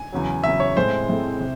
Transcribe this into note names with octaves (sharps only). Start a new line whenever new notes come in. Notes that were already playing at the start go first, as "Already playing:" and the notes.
Already playing: G#5
E2 C#3 F#3
E2 C#3 F#3 E5
C#5
A2 G#3 C4 E4 A4 C5
A2 G#3 C4 E4 A4
C3